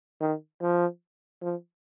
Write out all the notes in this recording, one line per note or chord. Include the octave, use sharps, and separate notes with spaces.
D#3
F3
F3